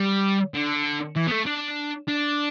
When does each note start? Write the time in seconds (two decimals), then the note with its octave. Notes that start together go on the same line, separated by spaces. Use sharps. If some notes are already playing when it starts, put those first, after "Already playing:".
Already playing: G3
0.54 D3
1.16 E3
1.27 B3
1.32 A3
1.47 D4
2.08 D4